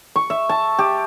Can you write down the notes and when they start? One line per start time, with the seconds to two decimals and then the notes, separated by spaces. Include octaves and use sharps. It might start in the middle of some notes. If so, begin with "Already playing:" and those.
0.16 C#6
0.30 E5
0.49 A5
0.79 G4